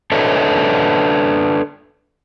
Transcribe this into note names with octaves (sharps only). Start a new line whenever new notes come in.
D4 A4 B4 C#5 D#5 E5